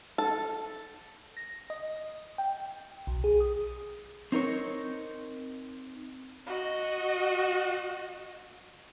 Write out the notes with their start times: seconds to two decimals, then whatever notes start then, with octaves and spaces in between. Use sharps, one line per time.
0.18 A4
1.37 A#6
1.70 D#5
2.38 G5
3.07 B1
3.24 G#4
3.40 D#6
4.32 C4 D#4 A#4 C#5
6.46 F#4 D#5